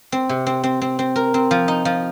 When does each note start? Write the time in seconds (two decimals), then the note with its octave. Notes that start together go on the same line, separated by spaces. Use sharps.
0.12 C4
0.29 C3
0.47 C4
0.64 C4
0.82 C4
0.99 C4
1.16 A#4
1.34 C4
1.51 F3
1.68 D#4
1.85 F3